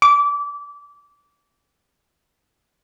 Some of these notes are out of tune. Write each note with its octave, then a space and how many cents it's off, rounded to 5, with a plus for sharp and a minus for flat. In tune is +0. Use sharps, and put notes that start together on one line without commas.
D6 -25